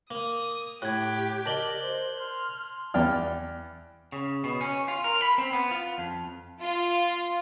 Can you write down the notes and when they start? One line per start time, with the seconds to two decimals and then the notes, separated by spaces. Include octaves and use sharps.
0.11 A#3 D#6
0.82 A2 G4 F#6 G#6
1.46 A#4 D5 D#5 A5 F#7 G7
1.82 C5
2.18 C6 F6
2.94 E2 D5 G5 F6
4.12 C#3
4.44 B2
4.61 C#4
4.88 F4
5.04 A#4
5.22 B5
5.38 C4
5.53 B3
5.71 F4
5.98 F2
6.61 F4